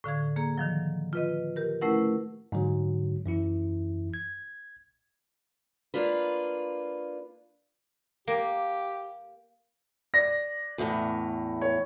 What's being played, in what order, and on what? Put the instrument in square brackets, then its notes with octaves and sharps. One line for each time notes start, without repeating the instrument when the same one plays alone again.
[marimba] A2 D3 F5 G#6
A#3 G#4 A#5
D#3 F3 F#3
F4 B4 D#5
G4 A#4
A3 C#4 E4 A#4 B4 F#5
[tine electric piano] G#2 D3 F#3
F#2 E3 E4
G#6
[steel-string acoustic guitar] A#3 D4 F4 B4
[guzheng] A#3 [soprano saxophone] G4
[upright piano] D5 A#6
[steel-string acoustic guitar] E2 A2
[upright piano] C#5